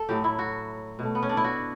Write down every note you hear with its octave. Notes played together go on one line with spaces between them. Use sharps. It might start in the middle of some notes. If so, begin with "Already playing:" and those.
Already playing: A4
A2 F#3 A3 G4
E4
F#4
B2 A3
B3
C#4
D4
E4
F#4